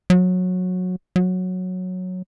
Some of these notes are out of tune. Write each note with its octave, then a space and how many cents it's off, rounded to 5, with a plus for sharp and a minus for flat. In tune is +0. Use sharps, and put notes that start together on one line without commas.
F#3 -20
F#3 -10